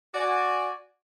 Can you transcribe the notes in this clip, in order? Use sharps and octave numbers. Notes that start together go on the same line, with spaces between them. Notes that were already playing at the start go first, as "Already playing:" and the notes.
F#4 D5 G#5